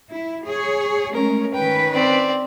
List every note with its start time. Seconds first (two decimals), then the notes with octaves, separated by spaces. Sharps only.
0.11 E4
0.45 G#4 C#5
1.13 G#3 A3 C#4 A#4
1.54 D#3 C#4 B4 G5
1.94 C4 D5